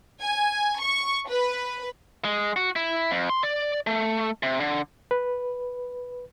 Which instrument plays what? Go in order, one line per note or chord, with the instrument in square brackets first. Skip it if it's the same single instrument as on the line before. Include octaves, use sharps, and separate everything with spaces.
[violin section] G#5
C#6
B4
[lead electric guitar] G#3
F#4
E4
F2
C6
D5
A3
C3
D3
[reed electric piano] B4